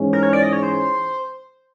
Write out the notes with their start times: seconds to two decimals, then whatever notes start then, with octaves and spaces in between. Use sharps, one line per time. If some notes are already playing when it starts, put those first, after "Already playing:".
Already playing: G#2 E3 G#3 C#4
0.13 A#4
0.23 C#5
0.33 D5
0.43 D#5
0.53 C#5
0.63 C5